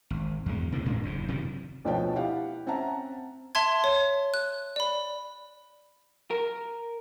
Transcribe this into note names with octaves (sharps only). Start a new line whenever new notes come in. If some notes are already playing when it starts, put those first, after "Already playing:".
G#1
E2 G#3
D2 C3 E3 A#3
A1 A2 G#3 D4
F#1 E2 G#2
C3 D#3 E3 F#3
D2 B2 F3 C#5 G5 A5
E4 G4 F5 F#5
C4 C#4 E5 F#5 A5 A#5
E5 A5 C6 G#6
C#5
F#6
D5 B5
A#4